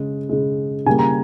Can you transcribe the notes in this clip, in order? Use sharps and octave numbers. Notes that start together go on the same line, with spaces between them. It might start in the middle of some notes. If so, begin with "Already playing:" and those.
Already playing: C#3 G#3
C#3 G#3
C#3 G3 A#3 G#5
A#5